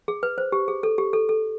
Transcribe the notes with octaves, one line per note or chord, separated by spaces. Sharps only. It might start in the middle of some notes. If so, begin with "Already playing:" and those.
G#4
B4
C5
G4
G#4
A4
G4
A4
A4